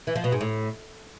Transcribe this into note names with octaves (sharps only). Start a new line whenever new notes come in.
E3
F3
B2
G#2
A2